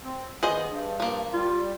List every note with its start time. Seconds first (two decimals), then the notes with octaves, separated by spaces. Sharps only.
0.04 C4
0.43 D#2 B3 G#4 C5 D#5
0.68 G2
1.00 F3 A#3
1.34 G3 F4